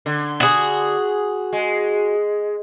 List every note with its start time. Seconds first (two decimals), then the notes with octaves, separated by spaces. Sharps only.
0.06 D3
0.40 F#4 G#4
1.53 G#3